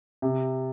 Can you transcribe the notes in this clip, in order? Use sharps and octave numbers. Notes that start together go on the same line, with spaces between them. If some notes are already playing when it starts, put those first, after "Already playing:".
C3